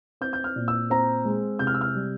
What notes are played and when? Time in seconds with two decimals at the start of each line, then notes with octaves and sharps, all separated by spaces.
0.21 C4 G6
0.33 G6
0.44 F6
0.56 A#2
0.68 E6
0.90 C4 A#5
1.25 G#3
1.59 C3 G6
1.67 F6
1.75 E6
1.81 F6
1.95 G3